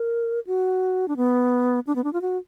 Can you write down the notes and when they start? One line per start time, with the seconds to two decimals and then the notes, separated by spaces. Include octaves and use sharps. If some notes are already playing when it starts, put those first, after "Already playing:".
Already playing: A#4
0.47 F#4
1.08 D4
1.17 B3
1.87 D4
1.96 B3
2.04 D4
2.13 F4
2.22 F#4